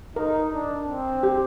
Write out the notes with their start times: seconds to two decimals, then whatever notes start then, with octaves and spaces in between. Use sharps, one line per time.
0.16 D#4 A#4
0.52 D4
0.88 C4
1.23 G4